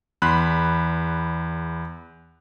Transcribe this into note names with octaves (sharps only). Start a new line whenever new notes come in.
E2 B5 C6 F#6